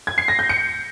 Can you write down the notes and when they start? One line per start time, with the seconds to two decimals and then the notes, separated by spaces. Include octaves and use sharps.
0.07 G#6
0.18 C7
0.28 A#6
0.39 G6
0.49 C#7